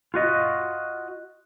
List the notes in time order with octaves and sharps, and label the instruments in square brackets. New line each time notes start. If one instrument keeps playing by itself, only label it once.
[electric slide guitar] F4 F#4 D#5